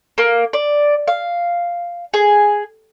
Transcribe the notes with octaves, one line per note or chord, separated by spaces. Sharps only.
A#3
D5
F5
G#4